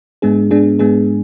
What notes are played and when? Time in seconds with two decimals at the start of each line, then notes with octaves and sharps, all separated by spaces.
0.22 G#2 G#3 B3 D4 G#4
0.51 G#2 G#3 B3 D4 G#4
0.79 G#2 G#3 B3 D4 G#4